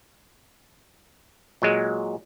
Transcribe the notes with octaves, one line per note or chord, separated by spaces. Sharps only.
A#2 F#3 G#3